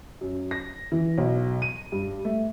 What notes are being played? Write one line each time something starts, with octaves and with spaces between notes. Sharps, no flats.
F#2
A#6
E3
B1
D#7
G2
A3